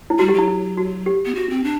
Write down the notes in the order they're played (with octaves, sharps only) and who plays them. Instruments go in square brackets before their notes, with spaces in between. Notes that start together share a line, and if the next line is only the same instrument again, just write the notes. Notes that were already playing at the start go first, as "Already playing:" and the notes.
[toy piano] E4
[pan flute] G3 [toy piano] F#4
[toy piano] G4
[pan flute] F#3 [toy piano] E4
[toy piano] E4
F#4
G4
[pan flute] B3
F#4
C4
D4